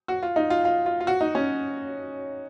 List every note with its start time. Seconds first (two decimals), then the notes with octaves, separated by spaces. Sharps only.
0.08 F#4
0.23 F4
0.36 D#4
0.50 F4
0.65 F4
0.86 F4
1.01 F4
1.07 F#4
1.21 D#4
1.35 C#4